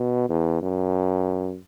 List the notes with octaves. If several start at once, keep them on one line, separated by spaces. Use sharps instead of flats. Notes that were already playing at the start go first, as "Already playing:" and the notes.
Already playing: B2
E2
F#2